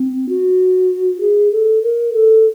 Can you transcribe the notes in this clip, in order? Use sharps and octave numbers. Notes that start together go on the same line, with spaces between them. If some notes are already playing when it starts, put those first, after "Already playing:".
Already playing: C4
F#4
G#4
A4
A#4
A4